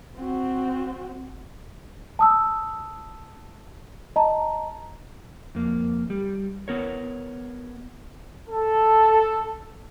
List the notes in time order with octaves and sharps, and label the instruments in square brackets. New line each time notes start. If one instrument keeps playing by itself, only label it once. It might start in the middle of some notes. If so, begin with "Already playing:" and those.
[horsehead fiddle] C4 F#4
[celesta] A5 D#6 E6
D#5 A5 A#5
[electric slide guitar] F2 A#3
G3
B3 A#4 C#5
[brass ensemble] A4